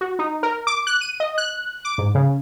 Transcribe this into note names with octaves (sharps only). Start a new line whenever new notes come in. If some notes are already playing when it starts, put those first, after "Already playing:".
F#4
D#4
A#4
D6
F#6
D#7
D#5
F#6
D6
G#2
C#3